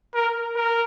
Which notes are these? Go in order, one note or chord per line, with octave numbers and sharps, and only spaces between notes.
A#4
A#4